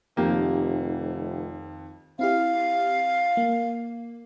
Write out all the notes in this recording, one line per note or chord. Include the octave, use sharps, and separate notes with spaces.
F1 F2 D#3 A#3 G4
C4 E4 G4 F5
A#3